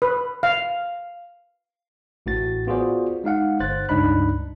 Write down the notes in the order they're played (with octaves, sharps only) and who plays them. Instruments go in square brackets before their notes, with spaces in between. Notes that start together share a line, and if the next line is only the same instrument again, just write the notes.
[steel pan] B4
F5
[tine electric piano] A1 A2 F#4 A6
B3 F4 F#4 G#4 C5 D5
G#3 D#4 F5 F#5
G1 C5 F#6 A6
C#2 G2 D4 D#4 B5 F#6